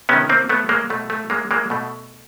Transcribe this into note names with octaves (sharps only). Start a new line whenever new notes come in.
C3 D#3 B3 C#4
A#3 C4
A3 B3
G#3 A#3
B2 A3
A3
G#3 A#3
G#3 A#3
B2 A3